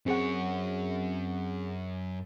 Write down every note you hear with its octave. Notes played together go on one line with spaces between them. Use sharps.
F#2 C4 G#4 C#5 F#5